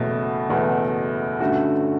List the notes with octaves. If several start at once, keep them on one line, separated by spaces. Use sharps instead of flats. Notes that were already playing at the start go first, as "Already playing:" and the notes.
Already playing: F#1 E2 B2 A3
F#1 E2 B2 A3
G2 D3 A3 C#4 F#4